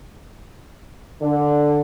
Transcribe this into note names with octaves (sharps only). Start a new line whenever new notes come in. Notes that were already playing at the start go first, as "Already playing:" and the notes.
D3